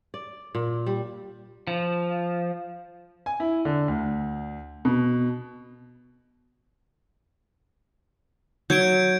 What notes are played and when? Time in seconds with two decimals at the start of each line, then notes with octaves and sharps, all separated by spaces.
0.14 D5
0.55 A#2
0.86 G3
1.67 F3
3.26 G#5
3.40 E4
3.65 D3
3.88 D2
4.85 B2
8.70 F#3 G6 G#6 D7